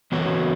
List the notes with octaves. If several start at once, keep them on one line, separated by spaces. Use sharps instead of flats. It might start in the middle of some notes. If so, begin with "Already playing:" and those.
E3 B3 F#4 C#5